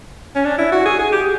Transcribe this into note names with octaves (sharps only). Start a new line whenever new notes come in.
C#4
D4
E4
F#4
G#4
G#4
G4